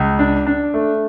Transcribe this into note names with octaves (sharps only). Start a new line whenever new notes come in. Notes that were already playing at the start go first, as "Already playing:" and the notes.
Already playing: C#2
D4
D4
A3